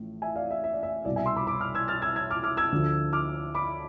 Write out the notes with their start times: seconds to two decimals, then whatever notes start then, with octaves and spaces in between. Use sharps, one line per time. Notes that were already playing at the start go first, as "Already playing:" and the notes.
Already playing: A1 A2 F3
0.22 E5 G#5
0.36 D5 F5
0.51 E5
0.64 E5
0.73 D5
0.83 E5
1.05 C2 B2 D5
1.16 E5 G#5
1.26 C6 E6
1.36 B5 D6
1.47 B5 D6
1.61 D6 F6
1.75 E6 G#6
1.88 F6 A6
2.02 E6 G#6
2.16 E6 G#6
2.30 D6 F6
2.44 D6 F6
2.57 E6 G#6
2.72 D2 D3 F3
3.13 D6 F6
3.55 B5 D6